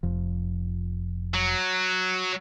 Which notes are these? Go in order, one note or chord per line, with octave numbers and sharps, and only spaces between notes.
F1 F2 F3
F#3